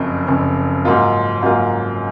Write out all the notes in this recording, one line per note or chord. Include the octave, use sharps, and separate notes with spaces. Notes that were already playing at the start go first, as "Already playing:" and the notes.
Already playing: F#1 F2 C#3
F#1 F2 C#3
G#2 F#3 A#3 F4
G#2 F#3 A#3 F4